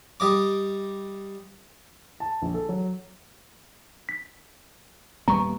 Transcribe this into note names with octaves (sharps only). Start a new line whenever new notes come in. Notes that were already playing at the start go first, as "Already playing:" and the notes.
G3 D#5 D6
A5
A#1
A4
F#3
B6
D#1 G3 B3 A#5 C#6